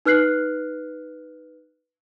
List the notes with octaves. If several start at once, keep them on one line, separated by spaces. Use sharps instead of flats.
D#4 B4 F6 F#6 C7 F#7